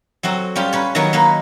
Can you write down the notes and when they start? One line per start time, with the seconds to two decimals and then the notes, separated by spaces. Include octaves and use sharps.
0.23 F#3 C4 F#4 A4
0.56 G3 C#4 F4 G4
0.73 C#4 B4 C#5
0.95 D#3 F#3 B3 B4 C#5 G#5
1.13 A#3 D#4 B4